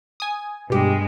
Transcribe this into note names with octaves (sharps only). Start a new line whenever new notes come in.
G#5 D#6
G2 B2 G#3 G4